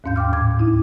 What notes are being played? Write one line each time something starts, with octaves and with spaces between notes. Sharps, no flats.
D#2 G#2 C#4 F5 G6
G5 C6 D6 F6
A2 D6 G#6
D2 D#4 E4